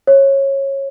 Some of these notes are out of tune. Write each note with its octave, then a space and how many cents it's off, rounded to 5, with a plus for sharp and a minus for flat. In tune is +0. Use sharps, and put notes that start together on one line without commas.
C#5 -20